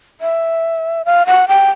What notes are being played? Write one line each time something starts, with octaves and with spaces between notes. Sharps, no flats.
E5
F5
F#5
G5